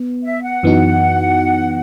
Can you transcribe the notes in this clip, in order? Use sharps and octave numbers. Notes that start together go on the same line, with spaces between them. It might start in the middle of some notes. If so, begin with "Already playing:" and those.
Already playing: B3
E5
F#5
F#2 E3 B3 D#4 F#4